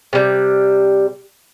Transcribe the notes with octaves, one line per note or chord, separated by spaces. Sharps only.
C3 G3